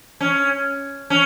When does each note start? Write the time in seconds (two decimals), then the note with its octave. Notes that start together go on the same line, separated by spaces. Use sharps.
0.21 C#4
1.10 C#4